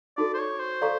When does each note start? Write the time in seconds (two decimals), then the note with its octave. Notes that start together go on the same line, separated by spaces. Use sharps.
0.17 D#4 F#4 A4 D5
0.34 C5
0.39 C#5
0.59 C5
0.81 A4 D5 F5 A#5 C#6